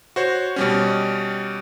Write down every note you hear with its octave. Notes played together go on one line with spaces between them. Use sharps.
F#4 C5 C#5
B2 G3 C#4